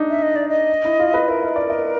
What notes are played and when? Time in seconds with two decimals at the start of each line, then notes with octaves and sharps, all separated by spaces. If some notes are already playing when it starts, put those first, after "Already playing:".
Already playing: D4 D#4
0.10 E5
0.22 D#5
0.36 D5
0.49 D#5
0.85 E4
1.00 F4
1.14 B4
1.29 A#4 E5
1.42 D#5
1.56 D5
1.70 D#5